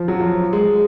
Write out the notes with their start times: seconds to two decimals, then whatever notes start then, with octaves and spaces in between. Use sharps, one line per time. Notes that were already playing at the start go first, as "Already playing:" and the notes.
Already playing: F3
0.08 F#3
0.20 F3
0.53 G#3